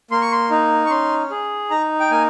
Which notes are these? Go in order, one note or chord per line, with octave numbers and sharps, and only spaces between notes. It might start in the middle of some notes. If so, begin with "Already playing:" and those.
A#3 C6
C#6
C6
D#4
C#6
C#4 C6
G#4
D#4 A#5
G5
A#3 G#5